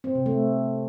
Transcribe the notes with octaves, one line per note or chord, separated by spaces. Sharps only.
C4
C3
A3